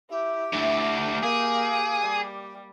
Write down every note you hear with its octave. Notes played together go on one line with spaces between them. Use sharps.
E4 G4
D2 D3 E4
A#3 G#4
G3